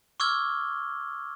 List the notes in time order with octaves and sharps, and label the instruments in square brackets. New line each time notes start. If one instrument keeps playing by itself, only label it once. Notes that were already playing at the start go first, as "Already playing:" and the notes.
[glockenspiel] C#6 D6 E6 F6 G#6 G7